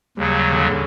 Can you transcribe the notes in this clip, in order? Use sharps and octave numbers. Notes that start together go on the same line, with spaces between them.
D#2 C#3 F#3 G3
D3
C#3